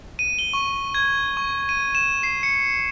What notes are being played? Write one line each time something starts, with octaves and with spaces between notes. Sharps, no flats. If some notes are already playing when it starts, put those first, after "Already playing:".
D#7
G7
C#6
G#6
C#6
D#7
E7
C7
C#7